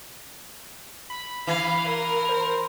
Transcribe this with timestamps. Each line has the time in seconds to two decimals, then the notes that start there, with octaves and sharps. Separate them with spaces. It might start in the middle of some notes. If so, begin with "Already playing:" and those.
1.10 B5
1.47 E3 F5
1.86 A#4
2.29 C5